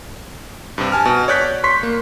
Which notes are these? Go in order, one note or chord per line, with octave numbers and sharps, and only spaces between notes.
G2 C3
G#5 A5 F6
B2
C#5 D5 F#6 G6 B6
C6 C#6 B6
A#3